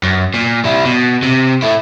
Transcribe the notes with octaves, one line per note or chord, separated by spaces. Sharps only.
F#2
A#2
G3 E4
B2
C3
A3 E4